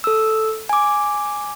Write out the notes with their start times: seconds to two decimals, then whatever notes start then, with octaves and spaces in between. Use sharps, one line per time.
0.04 A4 E6
0.69 G#5 D6